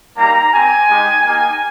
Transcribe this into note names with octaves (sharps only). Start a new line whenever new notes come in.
G3 A#3 D#4 G4 A#5
C4 G4 G#5
G#3 D#4 G4
A#3 D#4 G4 G#5